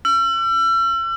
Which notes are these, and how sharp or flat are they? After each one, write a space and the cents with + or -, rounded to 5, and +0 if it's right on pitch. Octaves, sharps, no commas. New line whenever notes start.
E6 +40